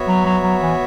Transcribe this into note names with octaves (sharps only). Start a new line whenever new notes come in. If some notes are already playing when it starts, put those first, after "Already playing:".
Already playing: B3 F#4 C#5 E5
F#3
F#3
F#3
E3